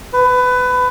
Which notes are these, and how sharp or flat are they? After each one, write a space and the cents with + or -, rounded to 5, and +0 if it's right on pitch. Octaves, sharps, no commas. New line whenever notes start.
B4 +20